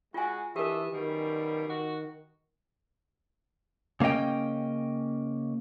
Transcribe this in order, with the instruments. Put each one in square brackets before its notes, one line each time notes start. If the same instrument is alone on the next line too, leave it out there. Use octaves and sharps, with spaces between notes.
[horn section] G#3 F#4 [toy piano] F4 G#5
[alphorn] E3 [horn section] D4 D#5 E5 [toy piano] G4 A#4
[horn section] F#2 B2 G3 [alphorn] D#3
[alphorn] D#3 [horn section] F#4
[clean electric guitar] C#3 A#3 C#4 D#5 G5